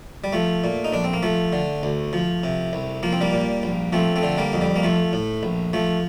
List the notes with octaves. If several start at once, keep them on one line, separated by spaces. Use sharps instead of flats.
G3
F3 A3
A#2
D#4
A#1 D4
C4
A#3
F3 A3
D3
D2
F3
C3
C2
F3 A#3
C4
G3 A#3
A#2
A#1
F3 A3 C4
A3 C4
D3
G3 A#3
F2
G3
A#3
F3 A3
A2
A#1
F3 A3